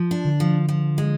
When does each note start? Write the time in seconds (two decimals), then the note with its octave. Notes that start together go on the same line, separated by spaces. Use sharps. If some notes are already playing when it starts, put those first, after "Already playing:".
Already playing: F3
0.11 D4
0.25 D3
0.40 F3
0.69 F3
0.98 G#3